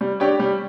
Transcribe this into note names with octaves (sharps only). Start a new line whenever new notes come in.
G3
D4 G4 C#5
G3